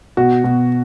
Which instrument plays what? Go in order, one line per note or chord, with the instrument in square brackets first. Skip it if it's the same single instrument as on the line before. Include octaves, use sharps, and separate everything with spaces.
[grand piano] B2 F#4
B2